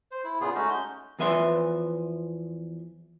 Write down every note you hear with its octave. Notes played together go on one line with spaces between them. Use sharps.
C5
E4
A#2 C#3 B3 F4 G#4
G#3 A3 C#4 D#4 F#4
G6
E2 F3 B4 E5 C6